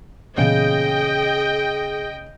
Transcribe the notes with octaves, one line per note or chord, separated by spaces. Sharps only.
A#2 C#3 E3 B3 G#4 D#5 G5